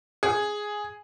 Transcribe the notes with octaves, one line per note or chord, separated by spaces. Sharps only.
G#4